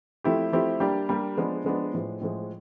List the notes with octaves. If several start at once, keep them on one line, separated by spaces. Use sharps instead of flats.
F3 A3 C4 E4 G4
F3 A3 C4 E4 G4
G3 A#3 D4 G4
G3 A#3 D4 G4
F3 G#3 B3 D4
F3 G#3 B3 D4
A2 F3 G#3
A2 F3 G#3